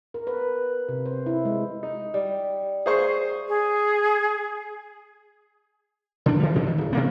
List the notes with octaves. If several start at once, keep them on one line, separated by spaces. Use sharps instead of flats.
A#4
B4
C3
C5
E4
G#3
D#4
G3
G#4 C5 C#6
G#4
D3 D4
E3 G3
E2 G2 C#3
D#3
D1
C3 A#3 B3